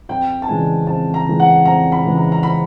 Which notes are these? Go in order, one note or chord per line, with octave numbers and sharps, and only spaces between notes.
F2 G5
A5
C#3 E3 G#3 G#5
F2 A5
A#5
C#3 E3 G#3
F#5
F2 A#5
B5
C#3 E3 G#3
A#5
A#5
B5